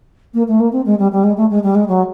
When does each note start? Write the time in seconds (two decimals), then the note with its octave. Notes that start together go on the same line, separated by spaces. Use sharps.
0.34 A#3
0.48 A3
0.60 A#3
0.72 C4
0.85 G#3
0.99 G3
1.12 G3
1.23 G#3
1.37 A3
1.50 G#3
1.63 G3
1.75 G#3
1.88 F#3